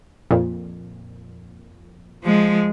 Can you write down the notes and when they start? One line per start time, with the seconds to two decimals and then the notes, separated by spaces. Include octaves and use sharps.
0.31 F2 A#2
2.24 F3 G#3